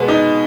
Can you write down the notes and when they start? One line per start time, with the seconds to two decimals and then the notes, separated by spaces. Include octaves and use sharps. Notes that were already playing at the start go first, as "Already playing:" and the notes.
Already playing: B2 G#3 B3
0.08 D#4